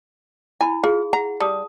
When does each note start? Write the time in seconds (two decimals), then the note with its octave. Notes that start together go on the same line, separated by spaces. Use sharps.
0.61 E4 G#5 B5
0.84 F4 G#4
1.13 F#5 A#5
1.40 G3 A5 D#6